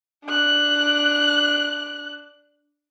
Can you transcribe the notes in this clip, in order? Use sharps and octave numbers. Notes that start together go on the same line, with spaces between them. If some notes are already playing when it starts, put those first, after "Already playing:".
D4 F#6